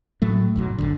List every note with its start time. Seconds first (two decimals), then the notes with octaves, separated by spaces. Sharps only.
0.22 A2 F#3 A3
0.56 E1 G#2 B2 F#3
0.78 F#1 B1 D3